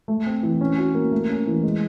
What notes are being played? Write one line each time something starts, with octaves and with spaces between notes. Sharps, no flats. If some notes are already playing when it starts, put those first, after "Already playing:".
A3
C4
E3
C#4
F#4
A#3
A3
C#4
E3
G#3